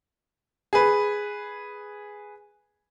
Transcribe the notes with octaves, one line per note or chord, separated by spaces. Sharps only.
G#4 B4